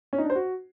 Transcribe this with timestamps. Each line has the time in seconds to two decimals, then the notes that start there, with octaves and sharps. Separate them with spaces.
0.13 C#4
0.18 D#4
0.24 D4
0.30 C5
0.35 F#4